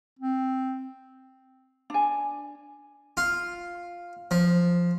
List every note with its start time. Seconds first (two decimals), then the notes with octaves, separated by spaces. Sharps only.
0.19 C4
1.90 D4 G#5
3.17 F4
4.31 F3